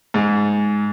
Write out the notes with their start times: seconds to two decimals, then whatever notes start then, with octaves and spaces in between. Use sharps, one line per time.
0.14 G#2